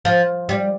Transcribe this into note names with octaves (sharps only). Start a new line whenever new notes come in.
F3
G3